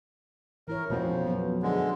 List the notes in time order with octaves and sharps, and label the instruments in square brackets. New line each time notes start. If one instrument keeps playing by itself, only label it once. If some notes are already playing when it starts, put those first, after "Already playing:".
[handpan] E3 E4 C#5 [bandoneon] A#4
[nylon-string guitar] F2 C4 F#4 [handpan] B2 C#4 [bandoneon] F3
[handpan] F#3 B3
[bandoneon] D3 G#3